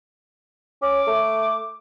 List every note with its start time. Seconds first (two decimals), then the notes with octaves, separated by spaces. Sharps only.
0.82 C#4 D6
1.07 A3